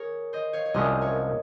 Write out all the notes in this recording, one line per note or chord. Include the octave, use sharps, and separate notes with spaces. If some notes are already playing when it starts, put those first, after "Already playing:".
Already playing: G#4 A#4 C#5
C5 D#5
C#5 F5
C#5
C2 C3 F3 G#3 C#4 C5 D#5
A#4 C#5